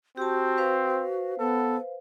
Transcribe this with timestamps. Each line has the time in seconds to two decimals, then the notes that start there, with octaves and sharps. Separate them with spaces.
0.17 C4 F#4 G4 A5
0.57 B4 C5 F5
1.39 B3 A4